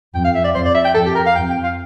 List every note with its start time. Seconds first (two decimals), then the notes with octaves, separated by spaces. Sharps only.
0.14 F2 G5
0.24 F5
0.35 E5
0.44 D5
0.54 F2 C5
0.65 D5
0.75 E5
0.85 G5
0.95 F2 A4
1.06 G4
1.15 A#4
1.26 F5
1.36 F2 G5
1.50 G5
1.63 F5